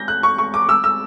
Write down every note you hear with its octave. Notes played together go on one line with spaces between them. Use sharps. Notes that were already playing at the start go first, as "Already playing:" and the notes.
Already playing: G6 A#6
F#6
C#6
C#6
D6
E6
E6